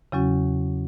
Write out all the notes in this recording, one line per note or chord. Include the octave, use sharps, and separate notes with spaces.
E2 C#3 F#3 C#4 F#4